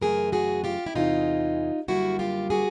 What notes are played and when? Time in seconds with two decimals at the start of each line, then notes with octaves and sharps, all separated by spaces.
0.01 F#2 C#3 E3 A3 G#4 A#4
0.32 F#4 G#4
0.64 F4 G4
0.86 E4
0.95 E2 C3 E3 G#3 D#4 F4
1.88 F#2 D3 G3 A#3 E4 F#4
2.19 F4 G4
2.50 F#4 G#4